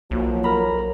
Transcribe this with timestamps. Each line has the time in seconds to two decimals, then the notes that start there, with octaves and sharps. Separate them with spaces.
0.11 B1 F3 F#3 A#3
0.44 A#4 C#5 A#5 B5